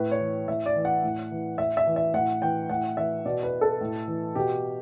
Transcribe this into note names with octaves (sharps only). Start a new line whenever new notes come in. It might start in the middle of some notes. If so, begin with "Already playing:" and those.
Already playing: A2 B4
C#5
E3
A2 E5
D5
E3
F#5
A2
E3
A2 E5
E5
E3
E5
A2 F#5
E3 G5
A2 F#5
E3 E5
B2 D5
B4
A4
A2
E3
B2 G4